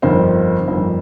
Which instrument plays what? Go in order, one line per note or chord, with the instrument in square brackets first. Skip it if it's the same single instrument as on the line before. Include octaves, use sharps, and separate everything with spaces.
[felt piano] G1 F2 D#3 C5
G1 F2 D#3